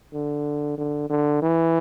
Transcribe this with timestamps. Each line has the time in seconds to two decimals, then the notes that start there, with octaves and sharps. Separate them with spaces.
0.14 D3
0.78 D3
1.10 D3
1.42 E3